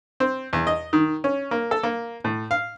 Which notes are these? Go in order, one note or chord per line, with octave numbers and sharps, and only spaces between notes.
C4
E2
D#5
D#3
C#4
A#3
A4
A#3
A2
F5